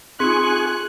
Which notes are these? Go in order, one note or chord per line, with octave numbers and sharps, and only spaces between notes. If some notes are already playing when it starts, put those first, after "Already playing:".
C4 D#4 F4 G#4 G#5 C6 C#6 F#6